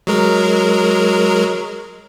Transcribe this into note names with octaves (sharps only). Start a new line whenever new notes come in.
F#3 G#3 A#4